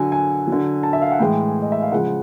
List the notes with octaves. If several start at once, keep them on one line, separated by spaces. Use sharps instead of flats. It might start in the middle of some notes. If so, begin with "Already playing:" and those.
Already playing: D3 F#3 G#5
G#5
D3 F#3
A5
E5
F5
F#5
A2 E3 G#3 G5
D#5
E5
F5
C#3 F3 G#3 F#5